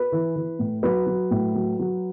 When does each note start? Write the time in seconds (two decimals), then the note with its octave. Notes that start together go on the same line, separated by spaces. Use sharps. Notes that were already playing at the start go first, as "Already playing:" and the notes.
Already playing: B4
0.12 E3
0.36 E3
0.59 A2
0.83 F#3 B4
1.07 F#3
1.31 A2
1.55 F#3
1.79 F#3